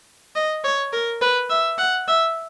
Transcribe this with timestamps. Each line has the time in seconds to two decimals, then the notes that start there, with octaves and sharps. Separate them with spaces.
0.36 D#5
0.64 C#5
0.93 A#4
1.21 B4
1.50 E5
1.78 F#5
2.08 E5